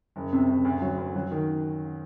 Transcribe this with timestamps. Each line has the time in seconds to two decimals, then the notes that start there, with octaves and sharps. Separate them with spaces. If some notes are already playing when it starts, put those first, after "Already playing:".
0.16 F#1
0.33 C3
0.48 F#1
0.65 D2
0.82 F#3
0.98 D2
1.15 F#3
1.31 D#3